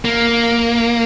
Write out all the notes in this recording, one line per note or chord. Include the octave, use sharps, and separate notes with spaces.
A#3